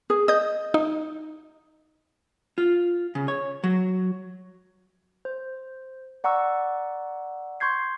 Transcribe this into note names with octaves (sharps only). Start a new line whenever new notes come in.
G#4
D#5 D#6 G6
D#4
F4
C#3
C#5
F#3
C5
D5 F#5 A#5 C#6 E6
C6 C#6 G6 G#6 C7